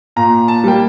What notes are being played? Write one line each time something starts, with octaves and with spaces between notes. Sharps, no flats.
A#2 A#5
A5
G3 A#3 G5